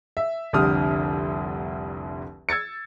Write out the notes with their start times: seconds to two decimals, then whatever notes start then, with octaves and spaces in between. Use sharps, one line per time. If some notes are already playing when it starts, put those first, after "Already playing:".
0.17 E5
0.53 F1 C2 D3 G4 D#6 F6
2.49 E6 G#6 A6 C#7